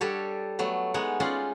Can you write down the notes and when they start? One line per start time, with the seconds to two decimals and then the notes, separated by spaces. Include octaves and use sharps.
0.01 G3 D4 G4 A4 C#5
0.59 F#3 A3 B3
0.94 G#3 B3 D#4 C#5 F#5
1.20 C#4 D#4 F4 D5 F#5 C6